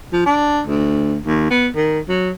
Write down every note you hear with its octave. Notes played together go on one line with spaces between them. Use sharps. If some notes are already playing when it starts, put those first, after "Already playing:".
F3
D4
D2
D#2
B3
D#3
F#3